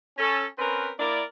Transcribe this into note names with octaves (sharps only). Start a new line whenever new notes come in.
C#4 A4
C4 C#4 A#4 B4
A#3 E4 A#4 D5